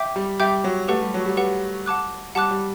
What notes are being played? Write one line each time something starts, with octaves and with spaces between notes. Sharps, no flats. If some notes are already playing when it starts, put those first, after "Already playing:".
Already playing: E5 G5 D6 G6
G3
G3 E5 G5 D6 G6
F#3
A3 G4 B4 F#5
G3
F#3
G3
G4 B4 F#5
F#5 A5 D6 F#6
G3 F#5 A5 D6 F#6
G3